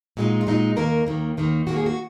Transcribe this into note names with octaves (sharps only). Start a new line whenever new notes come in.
A#2 G#3 D#4 F#4
F4
A#2 G#3 D#4 F#4
D#2 D#3 A#3 A#4
D#2 D#3 A#3
D#2 D#3 A#3
D#2 D#3 A#3 F#4
G#4
F#4